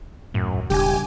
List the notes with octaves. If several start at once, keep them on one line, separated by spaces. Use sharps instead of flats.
D#1 F#2 A2
E1 C#3 G3 D4 G4 G#5